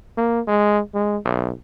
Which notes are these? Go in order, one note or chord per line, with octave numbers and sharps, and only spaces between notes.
A#3
G#3
G#3
B1